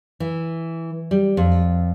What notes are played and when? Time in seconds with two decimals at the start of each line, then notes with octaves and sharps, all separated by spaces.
0.20 E3
1.11 G3
1.37 F2